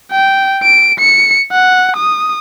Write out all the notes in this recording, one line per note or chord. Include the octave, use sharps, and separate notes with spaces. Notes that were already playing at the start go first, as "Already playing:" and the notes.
G5
D7
C#7
F#5
D#6